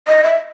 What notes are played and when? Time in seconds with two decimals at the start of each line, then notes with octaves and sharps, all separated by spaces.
0.08 D#5
0.24 E5